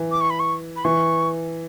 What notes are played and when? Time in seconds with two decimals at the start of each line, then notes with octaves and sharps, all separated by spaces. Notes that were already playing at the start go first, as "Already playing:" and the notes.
Already playing: E3
0.11 D6
0.20 C#6
0.30 B5
0.39 C#6
0.76 B5
0.84 E3 C#6